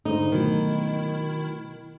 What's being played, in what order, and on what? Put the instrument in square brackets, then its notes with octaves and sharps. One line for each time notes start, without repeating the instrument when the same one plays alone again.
[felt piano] G#2 D3 A4 [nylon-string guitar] D#4
[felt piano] B2 [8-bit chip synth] D#3 E4 [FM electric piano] F#3 A3 A#4